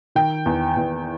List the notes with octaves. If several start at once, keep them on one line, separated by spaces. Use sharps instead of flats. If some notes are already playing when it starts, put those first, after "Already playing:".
D#3 G5
E2
E2